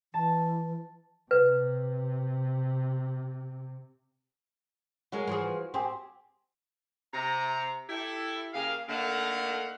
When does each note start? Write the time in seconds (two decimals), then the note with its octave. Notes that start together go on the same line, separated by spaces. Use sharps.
0.14 E3 A5
1.31 C3 B4
5.12 F#3 G#3 F#4 A#4
5.27 E3 F3 G#4
5.74 C4 G4 G#4 C5
7.13 C3 A#5
7.89 E4 G4 A4
8.54 C#3 A#3 G4 F5
8.88 D3 D#3 A3 A#3 F5 F#5